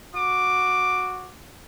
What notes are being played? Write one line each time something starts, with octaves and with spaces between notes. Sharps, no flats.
F#4 D6